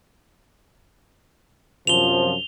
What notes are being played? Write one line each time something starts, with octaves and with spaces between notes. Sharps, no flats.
F#2 C3 F3 F7 G7